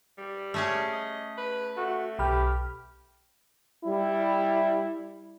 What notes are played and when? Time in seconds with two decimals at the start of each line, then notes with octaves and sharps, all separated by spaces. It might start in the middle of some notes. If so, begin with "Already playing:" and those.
0.18 G3
0.54 A3 C#4 G#4
0.93 D#5
1.38 B4
1.77 A3 F#4
2.19 B1 G4 B5 F6
3.85 G3 E4